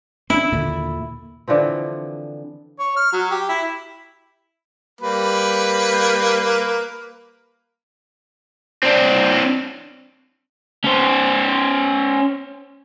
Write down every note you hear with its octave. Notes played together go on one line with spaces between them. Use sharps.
C4 D4 E4
D#2 A#2 D3
D3 E3 F3 C4
C#5
F6
F#3
G4
E4
G3 A#3 B4
C4 D4
C#4 C5